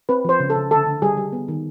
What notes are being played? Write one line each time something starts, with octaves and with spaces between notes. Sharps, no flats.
C4 B4
F3 C5
C#3
A4
C#3
D3 A4
D3
G3 G#4
G3
B3
D#3